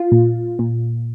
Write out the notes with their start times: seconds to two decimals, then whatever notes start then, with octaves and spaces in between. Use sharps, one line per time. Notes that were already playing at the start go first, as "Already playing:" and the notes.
Already playing: F4
0.12 A#2
0.59 A#2